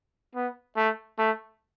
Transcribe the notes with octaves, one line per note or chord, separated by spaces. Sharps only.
B3
A3
A3